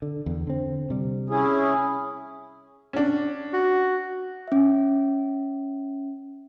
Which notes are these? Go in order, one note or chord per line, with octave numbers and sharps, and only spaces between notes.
D3
E2
D3 C4
C3 G3
C#4 E4 G#4
C#4 D4
F#4
C#4 E5